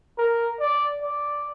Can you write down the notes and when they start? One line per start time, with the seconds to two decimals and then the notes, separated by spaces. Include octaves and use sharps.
0.18 A#4
0.60 D5
1.02 D5